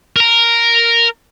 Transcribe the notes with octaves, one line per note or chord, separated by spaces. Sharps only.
A#4 A#5